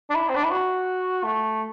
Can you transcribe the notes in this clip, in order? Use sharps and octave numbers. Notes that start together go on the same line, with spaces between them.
D4
E4
C4
D4
E4
F#4
A3